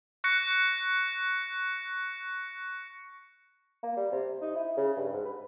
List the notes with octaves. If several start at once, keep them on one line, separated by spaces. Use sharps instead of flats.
C#6 F#6 A#6 C#7
A#3
G3
C3
D#4
E4
C#3
G2
G#2
B4